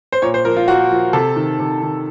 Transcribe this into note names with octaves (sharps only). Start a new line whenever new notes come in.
C5
A#2 C#5
C5
F3 A#4
F4
A#2 F#4
F3
C3 A4
D#3
C3
D#3